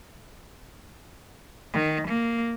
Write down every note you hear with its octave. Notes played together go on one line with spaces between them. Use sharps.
D#3
A#3